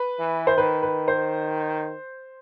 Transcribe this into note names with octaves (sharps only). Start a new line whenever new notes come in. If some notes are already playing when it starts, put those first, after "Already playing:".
Already playing: B4
E3
C5
D#3 B4
B4
C5